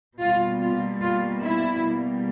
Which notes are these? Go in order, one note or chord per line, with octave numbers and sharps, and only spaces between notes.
B2 G3 A#3 F4
F4
F4
E4
B2 G3 A#3